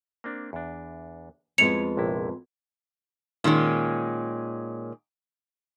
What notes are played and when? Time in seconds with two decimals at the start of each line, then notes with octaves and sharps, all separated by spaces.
0.24 A#3 C4 D4
0.53 E2 D4
1.58 F2 G#3 B3 E4 C#5 C#7 F7
1.97 A#1 C3 E4
3.44 A#2 D#3 G#3 C#4